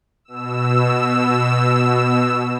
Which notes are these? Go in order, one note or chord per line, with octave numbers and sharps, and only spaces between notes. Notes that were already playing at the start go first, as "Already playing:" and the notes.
B2 E6